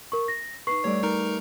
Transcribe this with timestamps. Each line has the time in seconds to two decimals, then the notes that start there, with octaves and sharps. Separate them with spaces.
0.12 A#4 C#6
0.28 A#6
0.67 D#4 B4 C#6 C7
0.84 G3 A3 C#5 D5
1.03 D#4 A#4 A#5